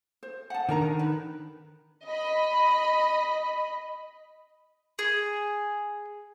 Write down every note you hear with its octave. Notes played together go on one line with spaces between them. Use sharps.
C5
F#5 A5
D#3 D4 A#4 A#5
B4
D#5 B5
G#4